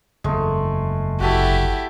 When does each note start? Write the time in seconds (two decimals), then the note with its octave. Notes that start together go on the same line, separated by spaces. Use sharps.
0.24 F#1 E2 G#3 A3
1.20 G1 E4 F#4 G4 A4 E5